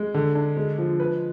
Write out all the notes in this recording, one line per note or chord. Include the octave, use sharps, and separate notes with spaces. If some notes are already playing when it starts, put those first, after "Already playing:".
Already playing: G#3
D3
D4
G#3
F3
B4